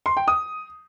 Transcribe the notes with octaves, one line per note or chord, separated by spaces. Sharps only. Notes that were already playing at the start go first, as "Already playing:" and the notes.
C6
G5
D#6